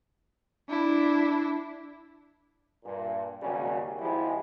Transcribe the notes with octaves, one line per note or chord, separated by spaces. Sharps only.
D4 E4
G2 A#2
G#1 D#2 C#3 F#3 G3 C#4
G#1 G#2 F3 G#3 E4 G4